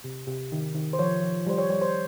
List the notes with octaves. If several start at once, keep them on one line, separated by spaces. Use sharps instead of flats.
C3
C3
D#3
D#3
C5
F3 C#5
F3
G3 C5
C#5
G3 C#5
C5